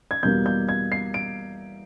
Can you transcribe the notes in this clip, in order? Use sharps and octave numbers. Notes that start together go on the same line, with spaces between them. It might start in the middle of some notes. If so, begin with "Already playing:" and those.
G#6
E2 B2 G3 A#3 G6
G6
G#6
C7
D7